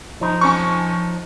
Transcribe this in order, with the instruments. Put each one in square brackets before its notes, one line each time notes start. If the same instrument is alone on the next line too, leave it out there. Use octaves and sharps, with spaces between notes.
[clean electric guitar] F3 D#4
[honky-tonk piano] F2 C#4 C#6